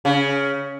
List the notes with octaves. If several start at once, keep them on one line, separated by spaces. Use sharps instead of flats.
C#3